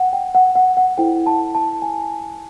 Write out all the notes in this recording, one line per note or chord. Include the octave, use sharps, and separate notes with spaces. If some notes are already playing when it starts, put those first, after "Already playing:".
Already playing: F#5 G5
G5
F#5
F#5
F#5
E4 A4 C5 G5
A5
A5
G#5